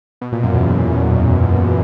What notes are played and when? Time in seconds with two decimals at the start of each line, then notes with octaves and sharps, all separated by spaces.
0.21 B2
0.32 A#2
0.43 F#2
0.54 E2
0.71 E2